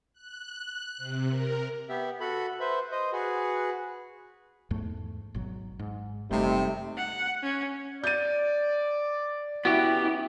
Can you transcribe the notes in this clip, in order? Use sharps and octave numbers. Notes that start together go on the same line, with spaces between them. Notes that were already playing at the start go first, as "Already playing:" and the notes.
F#6
C3
A#4
B3 G4 E5
F#4 A4 B5
B4 C5 E5
C5 D#5
F#4 G#4 B4
E2 G#2 A3
G#1 B2 F#3
G#2
F#1 C3 G3 A3 D#4
F#5
C#4
D5 G6 A6 D#7
B3 C#4 E4 F#4 G4 E5